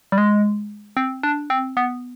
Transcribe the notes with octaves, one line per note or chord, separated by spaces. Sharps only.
G3
G#3
C4
D4
C4
B3